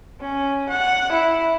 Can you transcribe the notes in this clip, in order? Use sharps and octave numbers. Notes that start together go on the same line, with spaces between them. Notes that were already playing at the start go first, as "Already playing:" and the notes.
C#4
F#5
E4